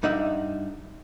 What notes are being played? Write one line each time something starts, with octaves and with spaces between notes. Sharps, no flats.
G2 D#4 E5 F#5